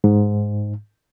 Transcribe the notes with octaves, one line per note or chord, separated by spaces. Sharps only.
G#2